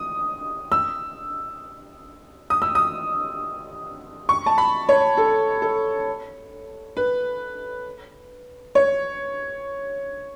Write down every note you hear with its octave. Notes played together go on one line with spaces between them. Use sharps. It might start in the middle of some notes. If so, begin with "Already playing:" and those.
Already playing: D#6
E6
D#6
E6
D#6
C#6
A5
B5
C#5
A4
A4
B4
C#5